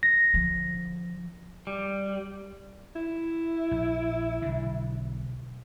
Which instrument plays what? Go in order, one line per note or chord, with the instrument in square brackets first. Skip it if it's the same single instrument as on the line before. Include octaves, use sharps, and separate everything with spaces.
[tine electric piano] A#6
[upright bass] D3 F3
[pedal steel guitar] G3
[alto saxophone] E4
[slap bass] A#1
B1 D3